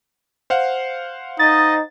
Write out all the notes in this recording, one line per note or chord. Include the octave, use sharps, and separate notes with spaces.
C5 F5 F#5
D#4 D#5 A6